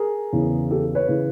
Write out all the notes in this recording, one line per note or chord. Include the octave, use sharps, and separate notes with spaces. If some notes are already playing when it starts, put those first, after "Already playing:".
Already playing: G#4 A#4
E2 C#3 E3
G4 A4
B4 C#5
C#3 E3